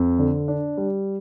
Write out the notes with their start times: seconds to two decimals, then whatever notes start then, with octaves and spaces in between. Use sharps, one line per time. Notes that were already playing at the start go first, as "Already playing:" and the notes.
Already playing: F2
0.19 D3
0.48 D4
0.78 G3